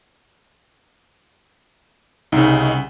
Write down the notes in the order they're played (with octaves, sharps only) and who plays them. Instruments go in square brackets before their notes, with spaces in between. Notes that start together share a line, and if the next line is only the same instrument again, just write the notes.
[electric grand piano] C2 C#3 [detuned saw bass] D#4